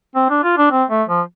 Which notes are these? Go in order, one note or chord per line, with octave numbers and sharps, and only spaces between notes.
C4
D4
F4
D4
C4
A3
F3